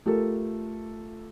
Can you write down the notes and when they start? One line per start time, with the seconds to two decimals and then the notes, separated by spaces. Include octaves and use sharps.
0.06 A3 F4 G4 A4 A#4